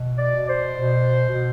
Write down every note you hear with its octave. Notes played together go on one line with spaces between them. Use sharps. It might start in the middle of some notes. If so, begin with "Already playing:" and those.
Already playing: B2
D5
B2
C5
B2
B2